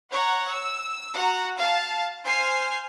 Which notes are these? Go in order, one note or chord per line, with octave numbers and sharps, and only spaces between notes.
C#5 F#5 A#5
E6
F#4 F#5 A#5
F5 A5 A6
C5 G#5 F6 C7